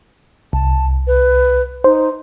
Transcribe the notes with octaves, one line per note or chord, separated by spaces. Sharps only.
C2 A5
B4
D#4 C5